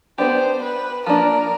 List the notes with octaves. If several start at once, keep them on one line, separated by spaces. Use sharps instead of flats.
B3 D4 G4 C5
B4
F3 A#3 D4 A#4